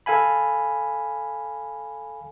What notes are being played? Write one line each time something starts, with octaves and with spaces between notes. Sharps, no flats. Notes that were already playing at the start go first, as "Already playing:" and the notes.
A4 F5 G#5 B5